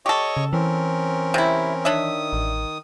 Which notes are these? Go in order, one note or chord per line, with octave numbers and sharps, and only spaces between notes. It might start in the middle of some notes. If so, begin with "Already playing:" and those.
G4 A4 C#5 D#5 C#6
C#3
E3 C4 C#4 A#4
C3 E4
D#3 D4 C#5 E5 D#6
A1